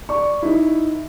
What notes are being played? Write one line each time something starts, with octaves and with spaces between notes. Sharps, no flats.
D5 C#6
D#4 E4